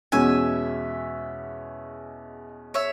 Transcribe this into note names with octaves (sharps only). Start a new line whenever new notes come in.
E2 B2 G#3 C#4 F#4 E5 G#5
C#5 E5